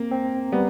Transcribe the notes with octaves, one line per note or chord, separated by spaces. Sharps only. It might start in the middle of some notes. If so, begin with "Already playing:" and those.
Already playing: A#3 C4
C4
G3 B3